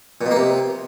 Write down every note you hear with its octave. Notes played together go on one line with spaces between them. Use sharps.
A#2
B2
A#3
C3